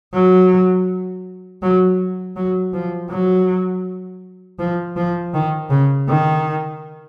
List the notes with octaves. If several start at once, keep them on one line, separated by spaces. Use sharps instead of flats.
F#3
F#3
F#3
F3
F#3
F3
F3
D#3
C#3
D#3